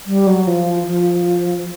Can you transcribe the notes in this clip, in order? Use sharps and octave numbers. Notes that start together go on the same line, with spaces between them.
G3
F#3
F3
F3